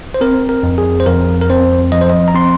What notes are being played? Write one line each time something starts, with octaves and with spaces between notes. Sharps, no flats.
C5
C4 A#4
A#4
F2
G#4
C5
F2 A#4
A#4
C4 C5
F3 D#5
C5
D#5
A#5
C4 C6